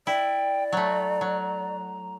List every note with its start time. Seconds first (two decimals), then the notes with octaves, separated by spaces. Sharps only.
0.07 E4 D5 G5
0.73 F#3 A3 A#5
1.21 F#3